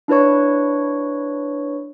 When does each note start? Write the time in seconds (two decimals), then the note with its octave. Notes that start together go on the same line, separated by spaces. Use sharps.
0.08 D4 E4 B4 C#5 C#6